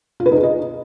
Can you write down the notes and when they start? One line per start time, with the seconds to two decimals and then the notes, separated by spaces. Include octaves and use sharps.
0.20 F4
0.26 B4
0.32 D#4
0.37 G#4
0.43 D#5